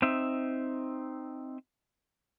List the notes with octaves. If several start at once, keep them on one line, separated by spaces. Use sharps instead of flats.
C4 D#4 E5